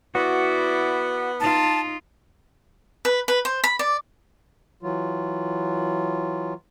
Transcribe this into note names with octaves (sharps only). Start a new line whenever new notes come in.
B3 E4 F#4 D5
D#4 F4 A5
B4
B4
C5
B5
D5
E3 F#3 F4